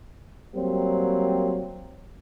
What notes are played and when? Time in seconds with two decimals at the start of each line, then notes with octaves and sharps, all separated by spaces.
0.55 F#3 G3 A#3 C4